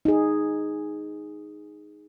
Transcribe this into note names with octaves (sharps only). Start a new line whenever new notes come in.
D#4 G#4